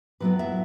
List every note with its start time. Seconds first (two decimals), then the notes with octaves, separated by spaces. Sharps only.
0.20 A2 F#3 B3 E4 B4
0.39 E5